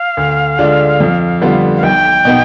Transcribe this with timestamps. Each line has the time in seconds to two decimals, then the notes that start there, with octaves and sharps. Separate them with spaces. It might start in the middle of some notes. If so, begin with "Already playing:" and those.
Already playing: F5
0.17 D2
0.59 D3 G#3 D4 F4
1.00 F2
1.42 D3 G3 B3 F4
1.77 F5
1.83 B1 G5
2.25 B2 B3 D#4